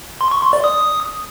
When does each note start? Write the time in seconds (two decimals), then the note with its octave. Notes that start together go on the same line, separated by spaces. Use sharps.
0.21 C6
0.31 C#6
0.42 C6
0.53 D5
0.64 D#6